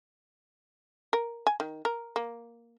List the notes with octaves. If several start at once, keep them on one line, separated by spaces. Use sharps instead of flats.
A#4
G#5
D#3
A#4
A#3